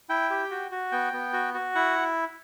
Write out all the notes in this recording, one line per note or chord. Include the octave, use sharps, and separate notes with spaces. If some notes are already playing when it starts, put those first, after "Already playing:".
E4 G5
G4
F#4
F#4
B3 G5
B3
F#4
F#4
E4 F#5